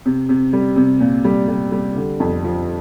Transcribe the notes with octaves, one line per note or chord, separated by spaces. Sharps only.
C3
C3
G3
C3
A#2
G3
G3
G3
D3
F2
F3